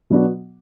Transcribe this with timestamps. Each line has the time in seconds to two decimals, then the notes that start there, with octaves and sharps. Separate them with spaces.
0.10 B2 F#3 B3 D4 F#4